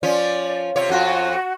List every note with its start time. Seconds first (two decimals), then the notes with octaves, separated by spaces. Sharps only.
0.03 F3 C#4 F4 D5
0.76 C3 F4 C#5
0.89 F2 F4 F#4